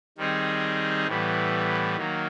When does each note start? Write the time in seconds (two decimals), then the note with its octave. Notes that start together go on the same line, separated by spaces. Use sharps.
0.17 D#3 G3 C4 D#4 G#4
1.07 A2 E3 G3 B3
1.97 D#3 F#3 A#3